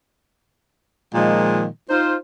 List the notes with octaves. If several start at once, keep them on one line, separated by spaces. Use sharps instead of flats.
A#2 D#3 F3 G#3
D#4 F4 C5